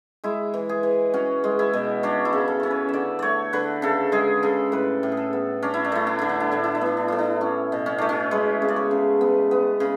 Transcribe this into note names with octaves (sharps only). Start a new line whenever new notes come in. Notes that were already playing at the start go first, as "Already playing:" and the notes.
G#3 E4
E3
G#4
E3
C#4 F#4
G#3
E4
B2
C#4 D4
E4
C#3
A4
C#4 C#5
B4
D3 D5 E5
A3 C#5 D5
D3 B4
C#3 A4
G#3 G#4
C#3 A4
A2 B4
A2
G#4
A4
B3
C#4 D4
E4
D4
A3 E4
D4
D3 E4
D4
E4
A2 D4
E4
D4
B3 E4
D4
A2 E4
D4
C#4
B2
C#4
A3 D4
C#4
G#3 B4
C#3
D5
C#5
C#3
B3
B3
C#3